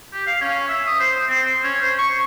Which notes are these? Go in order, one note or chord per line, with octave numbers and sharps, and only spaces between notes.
G4
F5
C#4
E5
D#6
C5
C4
C5
C#4
C5
C#6